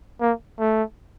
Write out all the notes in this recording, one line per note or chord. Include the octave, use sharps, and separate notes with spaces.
A#3
A3